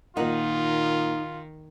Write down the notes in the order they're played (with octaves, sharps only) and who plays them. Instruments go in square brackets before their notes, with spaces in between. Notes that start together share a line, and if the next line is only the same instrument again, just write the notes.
[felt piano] A#2 A#4 [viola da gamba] D#3 [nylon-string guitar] D#4 F#5 [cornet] F4